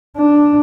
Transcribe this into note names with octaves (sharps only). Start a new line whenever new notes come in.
D4